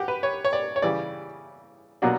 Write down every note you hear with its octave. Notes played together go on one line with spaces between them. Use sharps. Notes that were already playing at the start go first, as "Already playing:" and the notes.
Already playing: F#4 G4
B4
C#5
C#5
D5
C#5
C#3 E3 G3 D5
B2 F#3 A#3 D4 F#4